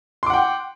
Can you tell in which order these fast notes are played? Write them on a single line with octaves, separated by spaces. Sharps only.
C6 D6 F#5 G5